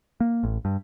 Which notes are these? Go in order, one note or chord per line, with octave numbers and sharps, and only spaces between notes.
A#3
A1
G2